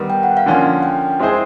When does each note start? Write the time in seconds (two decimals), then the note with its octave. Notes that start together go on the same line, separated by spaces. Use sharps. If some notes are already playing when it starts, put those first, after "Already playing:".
Already playing: D#3 G3 B3
0.10 G5
0.23 F#5
0.37 F5
0.46 D3 F3 A#3 C#4 F#5
0.83 G5
1.20 G#3 C4 E4 G#4 C5